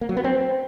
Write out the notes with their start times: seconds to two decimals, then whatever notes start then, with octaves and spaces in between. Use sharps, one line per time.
0.01 A#3
0.09 F#3
0.17 B3
0.24 C4